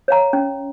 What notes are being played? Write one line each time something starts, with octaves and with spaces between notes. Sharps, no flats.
C#5 F5 A#5
C#4